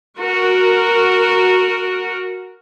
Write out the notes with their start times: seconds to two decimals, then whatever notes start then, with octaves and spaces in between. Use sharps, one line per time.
0.17 F#4 A#4